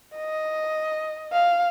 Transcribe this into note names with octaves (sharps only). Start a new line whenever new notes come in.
D#5
F5